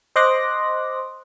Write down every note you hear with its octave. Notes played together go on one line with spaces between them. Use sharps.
C5 D#5 C6 D6 F#6 A#6